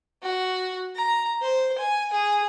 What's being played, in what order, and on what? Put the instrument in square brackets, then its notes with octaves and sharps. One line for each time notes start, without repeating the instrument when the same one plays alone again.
[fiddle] F#4
A#5
C5
G#5
G#4